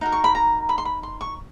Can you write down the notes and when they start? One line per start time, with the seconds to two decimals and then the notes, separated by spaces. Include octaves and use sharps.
0.01 D#4 F#4 A#4
0.12 C#6
0.24 B5
0.35 A#5
0.69 B5
0.78 C6
0.85 B5
1.03 C6
1.21 C#6